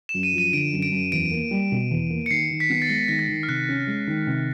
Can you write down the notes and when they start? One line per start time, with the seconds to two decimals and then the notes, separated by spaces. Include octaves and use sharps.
0.09 E7
0.14 F#2
0.23 D#7
0.33 F3
0.38 D#7
0.53 D3 D7
0.73 F#2
0.82 D7
0.92 F#2
1.12 E2 D7
1.31 A#3
1.51 G3
1.72 B2
1.91 E2
2.10 A#3
2.26 C#7
2.30 D#3 C7
2.51 D#3
2.60 B6
2.70 B3
2.82 A6
2.89 G#3 A#6
3.08 D#3 A#6
3.19 A6
3.29 D#3
3.43 F6
3.48 C3 F#6
3.69 C#4
3.87 G#3
4.07 D#3
4.27 C3